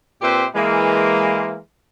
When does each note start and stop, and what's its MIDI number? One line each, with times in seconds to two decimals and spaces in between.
0.22 0.45 46
0.22 0.45 60
0.22 0.45 67
0.22 0.45 71
0.22 0.45 72
0.22 0.45 76
0.55 1.58 52
0.55 1.58 56
0.55 1.58 58